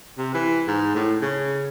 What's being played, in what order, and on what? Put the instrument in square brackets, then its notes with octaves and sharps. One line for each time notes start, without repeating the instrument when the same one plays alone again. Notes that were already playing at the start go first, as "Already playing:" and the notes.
[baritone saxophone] C3
E3
G#2
A2
C#3